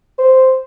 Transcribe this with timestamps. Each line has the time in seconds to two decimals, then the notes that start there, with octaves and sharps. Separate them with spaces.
0.18 C5